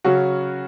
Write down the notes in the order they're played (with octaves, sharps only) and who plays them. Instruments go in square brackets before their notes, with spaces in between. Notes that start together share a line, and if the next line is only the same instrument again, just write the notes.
[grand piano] C#3 F#3 C#4 F#4